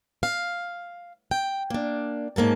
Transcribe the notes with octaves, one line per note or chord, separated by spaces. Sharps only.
F5
G5
A#3 D4
G#2 A#3 C#4 A5